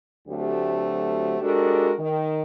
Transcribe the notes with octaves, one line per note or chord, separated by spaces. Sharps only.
D2 F#3 A3 C4 G4
G#3 D4 F#4 G4 A4 A#4
D#3